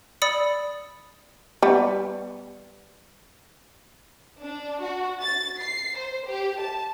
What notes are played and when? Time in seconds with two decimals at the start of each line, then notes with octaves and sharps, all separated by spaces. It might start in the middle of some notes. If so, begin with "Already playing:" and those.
0.22 D5 B5 D#6 E6 C#7
1.62 G3 B3
4.42 D4
4.81 F#4
5.21 A6
5.60 C7
5.98 C5
6.28 G4
6.59 A5